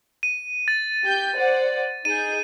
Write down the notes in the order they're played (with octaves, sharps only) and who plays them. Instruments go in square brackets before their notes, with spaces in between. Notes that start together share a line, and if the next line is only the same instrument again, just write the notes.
[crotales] D#7
A6
[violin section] G4 G5 G6
C5 D5 F#5
[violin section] D#4 G#4 G6 [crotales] D#7